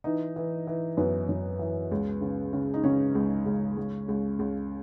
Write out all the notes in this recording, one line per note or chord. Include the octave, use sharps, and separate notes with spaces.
E3 D#4
E3
E3
F#2 B3
F#2
E3
C#2
C#3
C#3
D#4
C#3 C#4
C#2
C#2
C#2
C#2
C#2